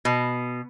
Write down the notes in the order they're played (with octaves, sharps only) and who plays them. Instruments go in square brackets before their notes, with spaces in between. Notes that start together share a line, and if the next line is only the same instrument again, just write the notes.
[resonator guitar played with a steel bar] B2